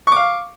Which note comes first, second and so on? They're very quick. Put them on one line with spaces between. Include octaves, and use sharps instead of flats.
C#6 D6 F5